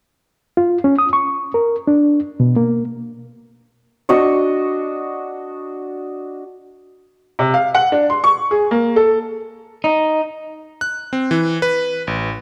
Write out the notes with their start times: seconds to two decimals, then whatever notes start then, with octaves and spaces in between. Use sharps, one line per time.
0.57 F4
0.84 C#4
0.99 D#6
1.13 C#6
1.54 A#4
1.87 D4
2.40 B2
2.56 A#3
4.09 D4 F#4 D#5 C#6
7.39 C3
7.54 F5
7.75 F#5
7.92 D4
8.10 C6
8.24 C#6
8.51 G#4
8.71 A#3
8.96 A4
9.84 D#4
10.81 F#6
11.13 C4
11.31 E3
11.62 B4
12.07 A1